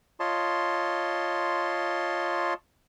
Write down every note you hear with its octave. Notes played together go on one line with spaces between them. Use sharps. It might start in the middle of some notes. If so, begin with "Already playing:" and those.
F4 C#5 D#5 A5 C6